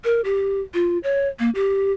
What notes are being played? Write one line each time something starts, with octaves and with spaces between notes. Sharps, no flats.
A#4
G4
F4
C#5
A#3
G4